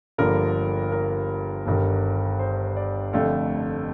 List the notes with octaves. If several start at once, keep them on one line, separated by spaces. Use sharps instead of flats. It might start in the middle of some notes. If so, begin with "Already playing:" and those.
G1 G2 D3 F3 A#3 A#4
A#4
G1 G2 D#3
C5
D5
F1 F2 D3 A3 F5